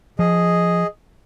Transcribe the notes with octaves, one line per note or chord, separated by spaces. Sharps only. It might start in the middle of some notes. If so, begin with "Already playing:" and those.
F3 G#4 D#5